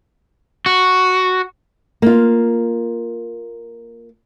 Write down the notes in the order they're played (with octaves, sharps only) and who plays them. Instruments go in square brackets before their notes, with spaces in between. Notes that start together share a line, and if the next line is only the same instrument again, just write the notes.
[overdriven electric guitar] F#4
[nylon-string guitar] A#3 F4